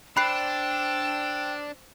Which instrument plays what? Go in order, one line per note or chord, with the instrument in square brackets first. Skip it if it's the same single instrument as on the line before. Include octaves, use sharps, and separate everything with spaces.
[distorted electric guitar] D4 [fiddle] C5 E6 [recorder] G5 [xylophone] B5 F#6 C7